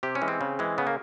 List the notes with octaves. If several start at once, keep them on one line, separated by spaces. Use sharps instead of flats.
C3 G4
C#4
E3 G#3
C4
C#3
E3 G#3
C#3 B3
A#3